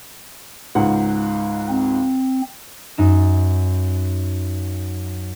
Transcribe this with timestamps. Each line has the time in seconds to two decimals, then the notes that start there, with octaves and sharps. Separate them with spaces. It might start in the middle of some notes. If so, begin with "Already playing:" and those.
0.75 C#2 G#2 F#5
1.69 C4
2.98 F#2 D#4 E7